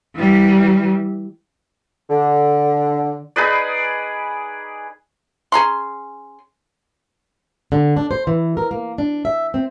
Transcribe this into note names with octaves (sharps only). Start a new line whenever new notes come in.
E3 G3
D3
D#4 G#4 B4 D5
C#4 G#4 A#5 C6
D3
D4
C5
E3
A#4
A#3
D4
E5
C4